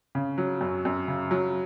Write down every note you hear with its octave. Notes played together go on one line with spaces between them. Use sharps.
C#3
F#3
F#2
F#2
C#3
F#3